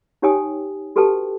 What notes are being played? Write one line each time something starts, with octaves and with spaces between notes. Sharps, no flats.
D#4 G4 C#5 G5 G#5 D#6
F#4 G4 A4 B4 G5 A5